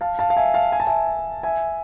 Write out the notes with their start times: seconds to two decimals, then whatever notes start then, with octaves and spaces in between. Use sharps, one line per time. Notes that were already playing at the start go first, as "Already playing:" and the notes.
0.01 F5 A5
0.19 F5 A5
0.30 F5
0.37 E5 G#5
0.54 F5 A5
0.72 G#5
0.80 A5
0.87 E5 G#5
1.43 E5 G#5